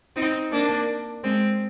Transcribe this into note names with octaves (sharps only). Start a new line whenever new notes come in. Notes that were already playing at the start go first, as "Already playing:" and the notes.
C4 D#4
A#3 D4
G#3 C4